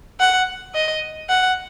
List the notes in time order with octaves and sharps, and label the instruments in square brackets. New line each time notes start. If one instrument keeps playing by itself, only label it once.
[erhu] F#5
D#5
F#5